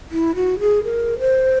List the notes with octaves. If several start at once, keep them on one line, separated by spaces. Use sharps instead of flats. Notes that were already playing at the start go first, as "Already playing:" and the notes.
E4
F#4
G#4
A#4
C5